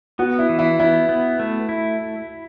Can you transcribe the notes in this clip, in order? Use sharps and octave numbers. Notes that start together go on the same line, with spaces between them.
B3 F#4
E4
E3
E4
B3 E4
B3
A3
E4